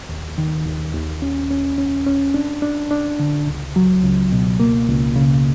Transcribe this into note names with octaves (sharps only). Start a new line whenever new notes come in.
D#2
D#3
D#2
D#2
C#4
C#4
C#4
C#4
D4
D4
D4
D3
C#2
F#3
C#2
B2
A#3
C#2
C#3